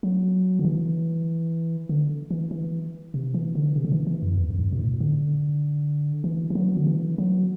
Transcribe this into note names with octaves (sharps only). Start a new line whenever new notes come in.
F#3
D3
E3
D3
E3
E3
C3
E3
D3
C3
D3
E3
E3
F#2
E2
F#2
G2
B2
A2
D3
E3
E3
F#3
D3
E3
F#3